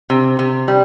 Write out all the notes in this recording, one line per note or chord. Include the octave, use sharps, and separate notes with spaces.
C3
C3
G3